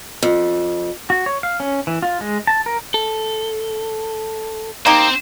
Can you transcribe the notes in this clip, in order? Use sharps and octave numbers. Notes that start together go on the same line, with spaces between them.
F2
F#4
C#5
F5
C#4
E3
F4
G#3
A5
A#4
A4
A#3 C4 D#4 G4 C5